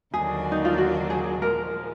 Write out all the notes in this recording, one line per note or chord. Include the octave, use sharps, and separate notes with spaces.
D#2 D3 F#3 A#3 D4 G#4
D#4
F4
F#4
G#4
A#2 F3 G#3 A#4